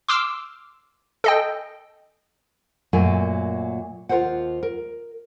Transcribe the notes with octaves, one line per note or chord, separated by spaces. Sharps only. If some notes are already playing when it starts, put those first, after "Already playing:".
C6 D6 E6 F6
A4 D#5 G5
F#2 A#2 F#3 A3 A#4 G#5
D#2 F4 A4 A#4 C5 F#5
A#4